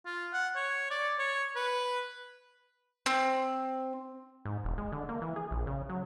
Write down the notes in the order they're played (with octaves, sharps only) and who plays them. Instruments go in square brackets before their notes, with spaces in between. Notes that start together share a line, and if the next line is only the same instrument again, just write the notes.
[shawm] F4
F#5
C#5
D5
C#5
B4
[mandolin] C4
[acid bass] G#2
E1
G#3
D3
A#3
E3
G#4
A#1
C#3
F#3